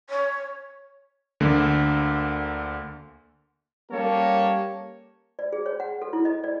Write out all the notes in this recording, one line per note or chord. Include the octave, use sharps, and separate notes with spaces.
C#5
D2 D3 A#3
G3 A#3 C#4 G4 A4 C#5
D5
G#4
C#5
F#5
A4
E4
D#5
D5